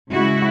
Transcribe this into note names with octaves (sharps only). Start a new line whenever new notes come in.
C#3 G#3 E4 F#4